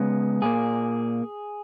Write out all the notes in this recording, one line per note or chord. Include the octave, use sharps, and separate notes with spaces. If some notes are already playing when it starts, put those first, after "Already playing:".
Already playing: C#3 G#3 B3
A#2 A#3 G#4